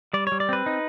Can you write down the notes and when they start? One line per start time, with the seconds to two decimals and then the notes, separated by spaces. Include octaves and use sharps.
0.13 G3 D5
0.27 G3 C#5
0.40 D5
0.49 C4 B4
0.66 D#4